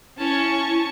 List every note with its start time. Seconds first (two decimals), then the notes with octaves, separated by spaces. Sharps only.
0.19 C#4 E4 A5 C#6